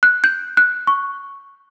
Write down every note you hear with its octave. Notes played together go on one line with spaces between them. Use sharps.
F#6
G6
F#6
C#6